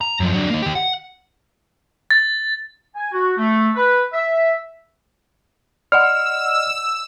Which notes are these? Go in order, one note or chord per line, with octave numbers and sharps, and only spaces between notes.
A#5
F#2 F3
F#3 D4
A#3 D#4
D#3 G4
F#5
A6
G#5
F#4
A3
B4
E5
D5 D#5 F#5 E6 F6